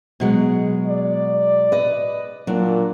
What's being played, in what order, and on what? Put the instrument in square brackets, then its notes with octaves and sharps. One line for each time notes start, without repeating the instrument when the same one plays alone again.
[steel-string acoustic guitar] B2 F#3 G#3
[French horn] D5
[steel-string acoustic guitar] B4 D#5
[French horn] A#2 [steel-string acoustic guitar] F#3 D4